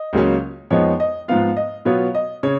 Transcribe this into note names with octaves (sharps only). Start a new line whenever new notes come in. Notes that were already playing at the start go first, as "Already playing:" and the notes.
Already playing: D#5
C#2 C#3 F#3 A#3 C#4
F2 F3 G#3 B3 D#4 C#5
D#5
G#2 F3 B3 F4 F5
D#5
B2 F#3 B3 F4 C#5
D#5
C#3 C#5